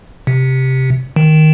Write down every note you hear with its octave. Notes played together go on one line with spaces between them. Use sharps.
C3
D#3